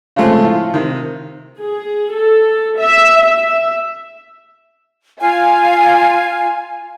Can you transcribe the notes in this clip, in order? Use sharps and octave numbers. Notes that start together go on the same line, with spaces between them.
C#3 F3 G#3 A3 C4
A2 F3 F4
C3 D#3
G#4
A4
E5
E5
F4 F5 G#5